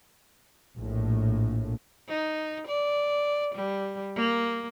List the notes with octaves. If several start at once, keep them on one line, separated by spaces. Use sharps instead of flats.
A#1 A2
D#4
D5
G3
A#3